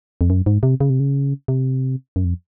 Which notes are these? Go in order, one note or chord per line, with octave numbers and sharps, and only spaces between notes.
F2
F#2
G#2
C3
C#3
C3
C#3
C3
F#2
F2